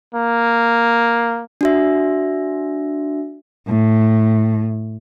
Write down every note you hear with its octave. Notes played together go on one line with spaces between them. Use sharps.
A#3
D4 F#4 E5
A2